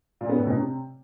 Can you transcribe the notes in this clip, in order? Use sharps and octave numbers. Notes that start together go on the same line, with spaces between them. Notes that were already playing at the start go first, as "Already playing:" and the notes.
A#2
B3
A2
B2
C3